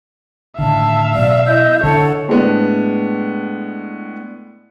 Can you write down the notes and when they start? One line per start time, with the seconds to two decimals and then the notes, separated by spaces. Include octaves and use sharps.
0.59 A2 D3 D#3 E5 F5 A5
1.15 B2 F#3 D5
1.46 E4 D#5 G6
1.83 D3 D4 A4 C#5 F#5 A5
2.28 A2 G#3 B3 D4